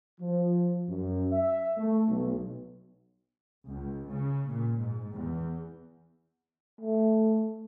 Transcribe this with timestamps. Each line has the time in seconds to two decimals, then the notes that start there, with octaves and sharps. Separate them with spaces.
0.19 F3
0.88 F#2
1.32 E5
1.76 A3
2.08 B1
3.66 C#2
4.07 C#3
4.48 A#2
4.77 G#2
5.12 E2
6.81 A3